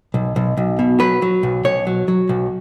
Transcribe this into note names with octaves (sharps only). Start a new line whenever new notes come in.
B1
B1
B1
B2
F#3 B4
F#3
B1
B1 C#5
F#3
F#3
B1